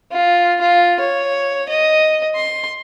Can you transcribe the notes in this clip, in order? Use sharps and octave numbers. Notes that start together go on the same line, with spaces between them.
F4
F4
C#5
D#5
C6